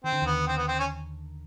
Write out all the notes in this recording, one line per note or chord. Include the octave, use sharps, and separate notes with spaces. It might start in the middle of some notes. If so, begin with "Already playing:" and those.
D#3 C4
D3
D#2 D#3 B3
C4
B3
C4
C#4